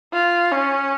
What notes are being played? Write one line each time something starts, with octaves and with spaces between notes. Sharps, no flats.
F4
C#4